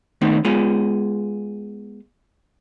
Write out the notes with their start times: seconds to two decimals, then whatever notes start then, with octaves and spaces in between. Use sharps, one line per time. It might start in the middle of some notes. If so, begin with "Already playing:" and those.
0.21 D#3 A3 B3 C4 D#4
0.45 G#3 B3 F4 G#4